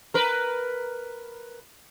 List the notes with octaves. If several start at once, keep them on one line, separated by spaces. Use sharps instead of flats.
A#4 B4